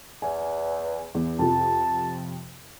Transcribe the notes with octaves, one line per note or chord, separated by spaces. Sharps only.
E2 G#5
E2
F2 C3 F3 A5